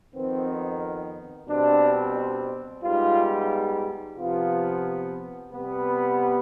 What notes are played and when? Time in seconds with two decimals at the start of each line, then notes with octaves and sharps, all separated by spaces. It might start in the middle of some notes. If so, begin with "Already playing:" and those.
0.14 F2 D#3 B3 C4
1.48 B2 G3 C4 D4
2.83 G#2 G3 B3 F4
4.17 C3 F3 B3 F4
5.52 C3 G3 B3